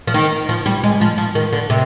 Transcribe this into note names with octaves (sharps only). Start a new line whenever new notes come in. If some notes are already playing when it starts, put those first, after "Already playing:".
F3
D#3
F3
G3
G#3
F3
F3
D#3
D3
C3